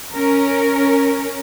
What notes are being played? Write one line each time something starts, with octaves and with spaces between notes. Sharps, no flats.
C#4 A#4